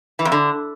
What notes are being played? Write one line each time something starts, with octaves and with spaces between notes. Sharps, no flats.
E3
F2
D3